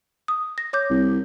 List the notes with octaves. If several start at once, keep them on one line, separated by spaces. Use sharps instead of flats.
D#6
A#6
C#5 D6 G6
C2